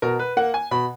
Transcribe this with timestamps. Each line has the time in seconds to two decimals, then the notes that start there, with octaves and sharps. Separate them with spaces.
0.02 B2 A#4
0.19 B4
0.37 A#3 F#5
0.54 G#5
0.71 B2 B5